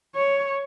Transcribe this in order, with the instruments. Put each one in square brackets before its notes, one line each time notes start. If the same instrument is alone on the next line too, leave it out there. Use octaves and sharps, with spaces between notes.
[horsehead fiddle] C#5